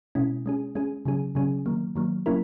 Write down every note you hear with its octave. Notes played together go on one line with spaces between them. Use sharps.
B2 G#3 C#4 E4
G#3 C#4 G#4
G#3 C#4 G#4
C#3 F#3 C#4 G#4
C#3 F#3 C#4 G#4
D#3 F#3 A#3
D#3 F#3 A#3
F#3 A#3 C#4 E4 A#4